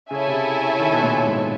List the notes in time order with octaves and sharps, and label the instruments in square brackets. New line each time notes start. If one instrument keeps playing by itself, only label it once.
[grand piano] C#3 [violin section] E4 A4 C#5 E5 G#5
[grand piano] C3
C#3
D#3
B2
A#2
G#2